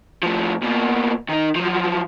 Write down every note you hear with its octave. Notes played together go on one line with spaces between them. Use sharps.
A2 F3
B2 A#3
D#3 D#4
F3 F#3